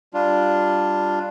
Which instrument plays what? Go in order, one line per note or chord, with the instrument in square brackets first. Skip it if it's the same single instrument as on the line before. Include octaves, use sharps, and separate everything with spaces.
[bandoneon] G3 D4 F4